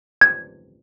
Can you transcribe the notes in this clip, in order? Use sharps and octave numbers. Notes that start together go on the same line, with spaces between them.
G#6